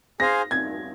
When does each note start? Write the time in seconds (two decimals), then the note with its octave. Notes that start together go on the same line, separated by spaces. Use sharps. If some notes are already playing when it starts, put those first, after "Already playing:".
0.20 G#4 C5 F5 G#5 A#6
0.51 G#6